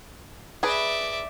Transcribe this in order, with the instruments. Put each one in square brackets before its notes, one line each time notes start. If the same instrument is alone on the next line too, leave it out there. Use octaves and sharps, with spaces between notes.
[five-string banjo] G#4 B4 [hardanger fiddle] D5 E5